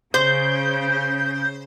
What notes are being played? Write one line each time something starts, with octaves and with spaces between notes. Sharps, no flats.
C#3 C5 G6